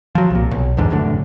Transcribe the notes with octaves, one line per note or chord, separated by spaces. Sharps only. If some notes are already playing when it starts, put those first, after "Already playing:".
F3 F#3
C2 A#2
B1
A1 E2 G#2 D3
F1 F#2 A2 D3